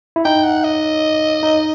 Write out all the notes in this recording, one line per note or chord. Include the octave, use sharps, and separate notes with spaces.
E4
D#4 G5
F#5
D#5
D#4